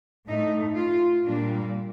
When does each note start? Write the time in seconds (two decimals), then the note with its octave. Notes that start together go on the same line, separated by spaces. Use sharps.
0.27 A2 A3 D#4
0.76 F4
1.26 A#2 G3 A#3 D4